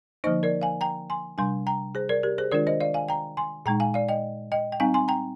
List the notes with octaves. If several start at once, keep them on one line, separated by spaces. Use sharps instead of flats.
D3 F3 A#3 D#4 C5 D#5
A#4 D5
F5 G#5
G5 A#5
G#5 C6
C3 G3 D4 G#5 C6
G5 A#5
G#4 C5
A#4 D5
G4 A#4
G#4 C5
D#3 G#3 D4 F4 A#4 D5
C5 D#5
D5 F5
F5 G#5
G5 A#5
G#5 C6
A#2 G#3 D#4 G5 A#5
F5 G#5
D5 F5
D#5 G5
D#5 G5
G5
G3 C4 D#4 F5 G#5
G#5 C6
G5 A#5